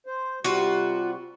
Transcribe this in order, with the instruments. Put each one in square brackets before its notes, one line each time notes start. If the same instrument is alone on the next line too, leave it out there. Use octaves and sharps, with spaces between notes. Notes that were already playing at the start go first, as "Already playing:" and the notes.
[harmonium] C5
[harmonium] C3 G3 [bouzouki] F4 F#4